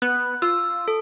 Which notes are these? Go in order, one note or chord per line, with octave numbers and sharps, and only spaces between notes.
B3 F#6
F4 E6
A4